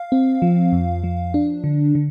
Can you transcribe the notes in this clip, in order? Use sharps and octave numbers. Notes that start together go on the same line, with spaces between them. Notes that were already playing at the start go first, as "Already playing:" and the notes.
Already playing: F5
C4
F3
F2
F3
D4
D3
D3